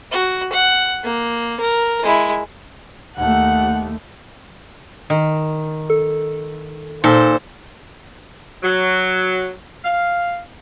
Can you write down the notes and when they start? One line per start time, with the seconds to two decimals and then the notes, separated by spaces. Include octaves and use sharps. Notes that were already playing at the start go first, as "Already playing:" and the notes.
0.12 F#4
0.53 F#5
1.03 A#3
1.61 A#4
2.03 G#3 E4
3.17 D#2 A3 F#5
5.10 D#3
5.90 A4
7.04 A#2 D#4 A4 C5
8.62 F#3
9.84 F5